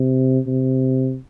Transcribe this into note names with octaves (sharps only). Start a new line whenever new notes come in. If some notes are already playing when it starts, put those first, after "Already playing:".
Already playing: C3
C3